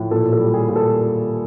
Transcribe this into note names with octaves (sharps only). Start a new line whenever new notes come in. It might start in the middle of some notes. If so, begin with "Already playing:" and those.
Already playing: A2 F3
A#2 A4
A4
G3
G#4
A#2
A4